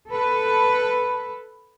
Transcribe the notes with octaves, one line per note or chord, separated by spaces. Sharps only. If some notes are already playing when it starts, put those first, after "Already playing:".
A4 B4